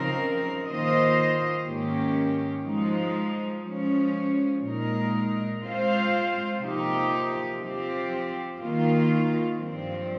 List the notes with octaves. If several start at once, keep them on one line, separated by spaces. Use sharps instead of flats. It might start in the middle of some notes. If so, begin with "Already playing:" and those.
Already playing: C#3 F3 C4 D#4 A#4
D#3 A#3 F4 C5 D#5
G#2 D#3 A#3 C#4 G4
F3 G#3 D#4
F3 G#3 C#4
A#2 G#3 D#4 A#4
G#3 C4 F4 C5 F5
C3 F3 A#3 D#4 G4
F3 C4 G4
D#3 A#3 F4
G2 F3 C4